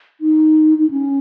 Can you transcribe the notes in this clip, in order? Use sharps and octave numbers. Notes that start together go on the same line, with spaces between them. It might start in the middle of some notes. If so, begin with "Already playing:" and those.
D#4
D#4
C#4